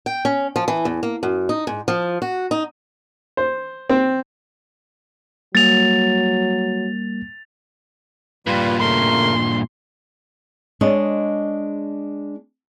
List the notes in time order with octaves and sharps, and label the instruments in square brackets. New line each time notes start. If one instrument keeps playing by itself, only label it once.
[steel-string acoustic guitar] G5
C#4
F3
E3
E2
A#3
F#2
D#4
G#2
F3
F#4
D#4
[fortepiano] C5
C4
[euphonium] F#3 [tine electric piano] G3 A#3 [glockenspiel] A6 F7
[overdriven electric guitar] G2 A#2 [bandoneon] G3 F4 B4
[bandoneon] C#3 A3 A#4 [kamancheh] C6
[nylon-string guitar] G#3 D4 C#5 D#5